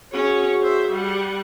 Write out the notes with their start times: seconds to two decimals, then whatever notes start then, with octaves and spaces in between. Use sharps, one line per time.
0.12 C#4 F#4 G#4 C#5
0.62 C5 E5
0.91 G3 F#5